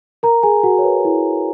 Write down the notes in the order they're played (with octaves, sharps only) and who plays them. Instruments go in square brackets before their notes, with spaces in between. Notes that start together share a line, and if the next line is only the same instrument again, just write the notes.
[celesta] A#4 A#5
G#4 G#5
F#4 F#5
C#5
B4
E4